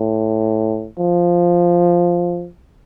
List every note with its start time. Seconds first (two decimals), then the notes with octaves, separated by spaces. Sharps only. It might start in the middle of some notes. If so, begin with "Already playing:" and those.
Already playing: A2
0.99 F3